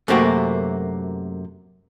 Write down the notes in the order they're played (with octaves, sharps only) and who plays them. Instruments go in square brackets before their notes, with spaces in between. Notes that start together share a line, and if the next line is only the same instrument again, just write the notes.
[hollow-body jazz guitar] F#2 C3 A3 A#3 F#4 G5